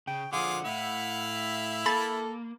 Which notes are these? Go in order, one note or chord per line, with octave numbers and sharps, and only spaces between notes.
C#3 G5
D3 F3 F4 G#4 F#5 D6
A2 E4 E5 F5
A#3 A4 B5 A6